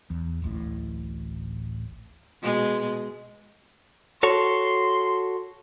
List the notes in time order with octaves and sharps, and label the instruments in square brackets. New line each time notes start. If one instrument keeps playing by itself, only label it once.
[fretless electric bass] E2
D1 A1 A2
[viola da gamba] B2 G#3
[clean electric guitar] F#4 A4 C#5 [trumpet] C6